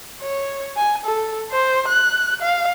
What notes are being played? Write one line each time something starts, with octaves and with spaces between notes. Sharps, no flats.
C#5
G#5
A4
C5
F#6
F5